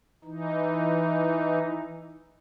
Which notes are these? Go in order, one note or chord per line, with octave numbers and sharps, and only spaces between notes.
E3 D#4